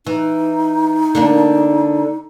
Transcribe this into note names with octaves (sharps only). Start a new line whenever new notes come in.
E3 D#4
D3 A#3 D4